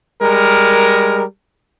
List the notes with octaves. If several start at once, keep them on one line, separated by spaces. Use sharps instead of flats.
G3 G#3 A#4